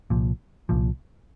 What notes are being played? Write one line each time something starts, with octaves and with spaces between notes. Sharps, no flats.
C2 A#2 F3
C2 A#2 F3